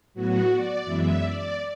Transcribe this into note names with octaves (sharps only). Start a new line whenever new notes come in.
A2 F#3 B3 F#4
D5
F#2 E3 G#3 B3 E5
D5